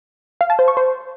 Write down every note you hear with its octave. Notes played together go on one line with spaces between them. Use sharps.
F5
A5
C5
C#6
C5